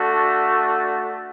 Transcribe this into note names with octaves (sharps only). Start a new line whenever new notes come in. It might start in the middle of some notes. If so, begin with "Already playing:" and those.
Already playing: A3 D4 F#4